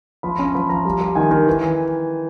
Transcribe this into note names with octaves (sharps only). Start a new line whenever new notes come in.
F3 B5
C#4
F3 B5
F3 A#5
G3
G3
D#3 G#5
D#3
E3